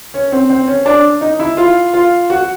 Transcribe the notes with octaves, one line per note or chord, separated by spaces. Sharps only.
C#4
C4
C4
C#4
D4
D#4
E4
F4
F4
F#4